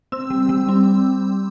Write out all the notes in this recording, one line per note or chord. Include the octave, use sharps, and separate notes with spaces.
C4 E6
G3
G3
C4